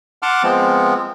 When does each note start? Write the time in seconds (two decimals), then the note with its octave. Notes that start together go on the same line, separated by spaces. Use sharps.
0.23 F#5 A5 C6 D6 F6
0.43 F3 G#3 B3 C4